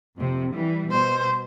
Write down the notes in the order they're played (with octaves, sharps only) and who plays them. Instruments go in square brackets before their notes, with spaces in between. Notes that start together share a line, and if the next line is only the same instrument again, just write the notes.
[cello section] F2 C3
E3 G3
[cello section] B2 [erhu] C5